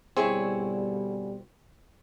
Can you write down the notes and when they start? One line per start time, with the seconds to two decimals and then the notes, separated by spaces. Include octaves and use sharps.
0.17 B2 D3 G3 C4 E4 G#4 C#5